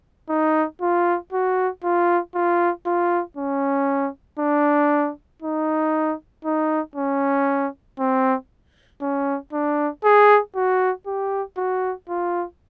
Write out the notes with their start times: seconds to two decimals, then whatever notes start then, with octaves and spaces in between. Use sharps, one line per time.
0.29 D#4
0.81 F4
1.33 F#4
1.83 F4
2.34 F4
2.86 F4
3.37 C#4
4.39 D4
5.42 D#4
6.45 D#4
6.95 C#4
7.99 C4
9.01 C#4
9.52 D4
10.04 G#4
10.55 F#4
11.06 G4
11.57 F#4
12.09 F4